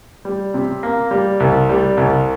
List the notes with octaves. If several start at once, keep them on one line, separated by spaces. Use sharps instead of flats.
G3
C3
A#3
G3
C2
G3
C2